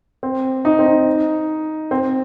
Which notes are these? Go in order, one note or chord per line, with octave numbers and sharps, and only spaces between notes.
C4
D#4
C4
D#4
C4